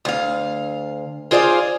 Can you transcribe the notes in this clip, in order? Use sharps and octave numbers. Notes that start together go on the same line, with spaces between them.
D2 F5
F4 G#4 C5 D5 E5 F5